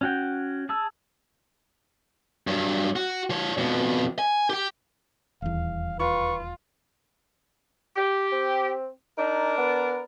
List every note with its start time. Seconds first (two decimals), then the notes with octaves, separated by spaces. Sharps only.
0.01 C#4 F#4 G5
0.69 G#4 A5 E6
2.47 G2 F#3
2.96 F#4
3.30 F3 C#5
3.58 F2 B2
4.19 G#5
4.50 G4 G5
5.42 D#1 E2 F5
6.00 F4 B4 C#6
7.97 G4
8.32 C4
9.18 D4 D#4 A#4 D5
9.58 B3